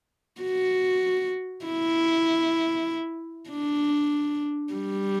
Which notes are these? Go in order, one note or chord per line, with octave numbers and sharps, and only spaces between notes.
F#4
E4
D4
G3